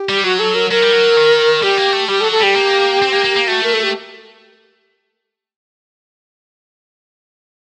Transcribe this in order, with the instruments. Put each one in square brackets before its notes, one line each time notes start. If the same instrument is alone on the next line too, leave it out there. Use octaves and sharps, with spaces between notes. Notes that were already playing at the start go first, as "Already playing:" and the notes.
Already playing: [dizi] G4
[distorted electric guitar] G3
[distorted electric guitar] F#3 [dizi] F#4
[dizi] A4
A#4
[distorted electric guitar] F#3 [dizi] A#4
[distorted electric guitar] G3
F#3
D#3
[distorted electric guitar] G3 [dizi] G4
[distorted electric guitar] A#3
A3
[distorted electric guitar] G3 [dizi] G4
[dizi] A4
[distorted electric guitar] F#3
[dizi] A4
[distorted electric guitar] G3 [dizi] G4
[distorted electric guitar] A#3
C4
A#3
A#3
A#3
[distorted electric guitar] A3 [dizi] F#4
[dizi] A#4
A4
G4